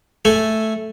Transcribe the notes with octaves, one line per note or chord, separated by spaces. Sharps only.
A3 A4 G#5